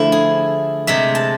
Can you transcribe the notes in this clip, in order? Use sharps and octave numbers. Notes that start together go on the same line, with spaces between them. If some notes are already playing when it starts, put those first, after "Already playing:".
Already playing: D3 F3 A3 E4
G#4
C3 G#3 E5
A5